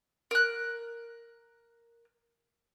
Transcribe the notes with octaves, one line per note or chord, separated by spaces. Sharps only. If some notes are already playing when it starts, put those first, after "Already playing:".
A#4 F#6